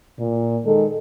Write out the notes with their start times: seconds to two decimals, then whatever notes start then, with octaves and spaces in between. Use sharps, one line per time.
0.18 A#2
0.66 D#3 G#3 A4